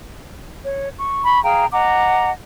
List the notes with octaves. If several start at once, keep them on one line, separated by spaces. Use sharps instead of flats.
C#5
C#6
B5 C#6
G#4 F5 G5 A#5
D#5 F#5 A#5 D6